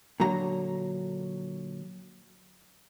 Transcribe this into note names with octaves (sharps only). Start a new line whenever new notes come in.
A#2 D3 F#3 A#5